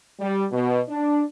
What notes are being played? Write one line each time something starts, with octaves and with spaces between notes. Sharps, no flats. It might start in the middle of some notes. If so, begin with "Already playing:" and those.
G3
B2
D4